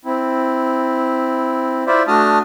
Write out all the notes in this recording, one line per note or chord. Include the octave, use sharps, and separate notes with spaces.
C4 E4
E4 F4 C5 D5 E5
A3 D4 F#4 A5 D#6 F6